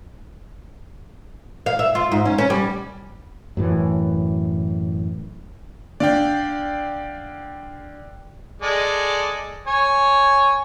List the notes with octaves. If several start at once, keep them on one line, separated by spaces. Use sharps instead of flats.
F5
E5
F4
G#2
C#4
C#4
G3
F#2 A2 E3
D3 D5 F5 G5
G#3 A4 D5
C#5 G#5